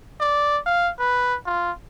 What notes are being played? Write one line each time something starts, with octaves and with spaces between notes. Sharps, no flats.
D5
F5
B4
F4